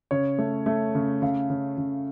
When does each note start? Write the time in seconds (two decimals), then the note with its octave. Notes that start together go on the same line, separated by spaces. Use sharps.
0.11 C#3 C#5
0.38 A3
0.66 A3
0.95 C#3
1.22 C#3 F5
1.50 C#3
1.78 C#3